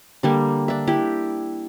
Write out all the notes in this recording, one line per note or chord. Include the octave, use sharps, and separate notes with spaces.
D3 G3 A#3
D4 E5
E4 G4